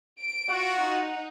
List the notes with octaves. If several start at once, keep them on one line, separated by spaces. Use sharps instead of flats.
D7
F4 F#4 F#5
D#4